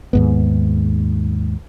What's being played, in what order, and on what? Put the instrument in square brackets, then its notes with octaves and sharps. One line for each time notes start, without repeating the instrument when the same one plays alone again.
[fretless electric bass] D#2 G#2 B3